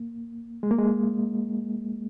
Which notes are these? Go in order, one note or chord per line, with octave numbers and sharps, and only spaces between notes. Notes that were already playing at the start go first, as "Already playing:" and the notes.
Already playing: A#3
G#3
A#3
G#3